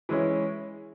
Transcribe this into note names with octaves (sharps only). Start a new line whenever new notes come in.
E3 G#3 C#4 E4